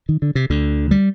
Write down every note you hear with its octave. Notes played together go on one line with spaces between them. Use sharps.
D#3
D3
C3
D2 D3
G3